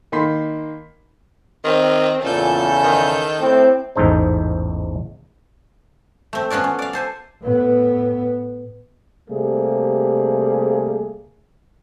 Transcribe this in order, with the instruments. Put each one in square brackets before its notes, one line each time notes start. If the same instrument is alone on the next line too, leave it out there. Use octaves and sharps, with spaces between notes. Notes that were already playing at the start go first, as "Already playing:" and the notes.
[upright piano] D#3 A#3 B5 C6 B6
[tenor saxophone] D#3 [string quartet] C4
[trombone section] E2 C#3 [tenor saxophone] A#2 [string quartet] A4 G6
[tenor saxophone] D#3
[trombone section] A2 [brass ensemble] C4
[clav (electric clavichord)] A1 E2 G#2 D#4 A4 C5
[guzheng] A3 C4
B3 C#4 F4 F#4 D5
C#4
D5 F5
A4 C5 G#5
[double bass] A2 B3
[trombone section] C3 G3 A3 A#3 G#4